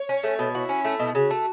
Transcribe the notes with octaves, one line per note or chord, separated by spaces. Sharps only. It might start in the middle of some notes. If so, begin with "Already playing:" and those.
Already playing: C#5
C#4
A3
B2
E4 F#4
C#4
A3
B2
C#3 F#4
A3